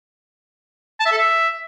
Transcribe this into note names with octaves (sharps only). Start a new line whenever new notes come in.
A5
E5
A4
E5